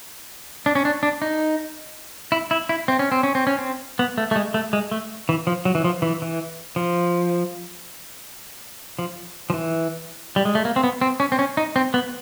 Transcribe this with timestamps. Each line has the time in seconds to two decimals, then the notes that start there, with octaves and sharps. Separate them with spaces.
0.66 D4
0.75 C#4
0.85 D4
1.03 D4
1.22 D#4
2.32 E4
2.51 E4
2.69 E4
2.88 C4
2.99 C#4
3.12 C4
3.23 C#4
3.35 C4
3.47 C#4
3.59 C4
3.99 B3
4.18 A3
4.31 A3
4.36 G#3
4.54 A3
4.73 G#3
4.91 A3
5.29 E3
5.47 F3
5.65 F#3
5.75 E3
5.84 F3
6.02 E3
6.22 E3
6.76 F3
8.99 F3
9.50 F3
9.54 E3
10.36 G3
10.45 G#3
10.55 A3
10.65 A#3
10.76 C4
10.84 B3
11.01 C4
11.20 C#4
11.32 C4
11.39 C#4
11.57 D#4
11.76 C4
11.94 B3